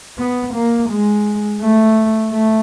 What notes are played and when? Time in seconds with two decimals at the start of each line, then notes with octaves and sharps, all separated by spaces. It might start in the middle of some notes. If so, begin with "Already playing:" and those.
0.18 B3
0.54 A#3
0.90 G#3
1.61 A3
2.32 A3